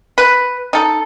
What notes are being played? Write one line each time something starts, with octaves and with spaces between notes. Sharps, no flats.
B4
D#4 A4